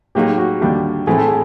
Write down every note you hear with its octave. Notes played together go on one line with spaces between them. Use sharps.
A2 F#3 A#3 D#4 G4 G#4
F#4
D#2 D3 G3 A#3 D4 G4
A2 E3 A3 C4 G#4
A4
G#4